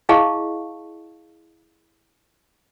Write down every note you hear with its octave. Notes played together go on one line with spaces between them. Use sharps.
E4 G#4 D#5 F5 A5 C#6